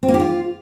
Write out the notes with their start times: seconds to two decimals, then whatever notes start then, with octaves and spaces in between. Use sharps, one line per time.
0.03 C4
0.08 A#3
0.14 G4
0.20 F4